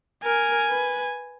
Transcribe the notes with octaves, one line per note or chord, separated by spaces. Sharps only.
A#4 G#5
B4